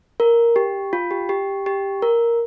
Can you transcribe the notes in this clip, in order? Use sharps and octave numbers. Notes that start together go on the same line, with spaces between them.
A#4
G4
F4
G4
G4
G4
A#4